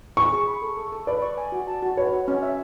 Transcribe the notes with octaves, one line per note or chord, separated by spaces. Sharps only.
G#5 C#6
G#4
B5
A4
A4
A4
B4 D5
C#6
G#5
F#4
A5
F#4
B4 C#5
F#4
C#4
E5